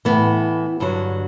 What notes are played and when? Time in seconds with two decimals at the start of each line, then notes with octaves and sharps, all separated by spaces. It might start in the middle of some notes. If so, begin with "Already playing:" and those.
0.05 A2 E3 B3
0.80 G2 D3 F#3